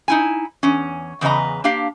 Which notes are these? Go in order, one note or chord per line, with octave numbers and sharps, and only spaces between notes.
D#4 E4 G#5
E2 C#4
E2 C#3 B4 D#5 A#5
A#3 D4 G4 F5